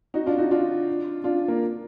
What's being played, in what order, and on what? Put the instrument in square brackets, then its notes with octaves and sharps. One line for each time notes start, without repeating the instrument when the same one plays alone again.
[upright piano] D#4 F#4
D4 F4
D#4 F#4
D4 F4
D4 F4
A#3